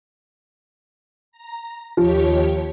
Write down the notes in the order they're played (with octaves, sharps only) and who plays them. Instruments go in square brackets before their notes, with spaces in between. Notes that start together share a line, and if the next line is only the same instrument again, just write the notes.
[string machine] A#5
[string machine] D#2 G4 C#5 [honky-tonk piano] F3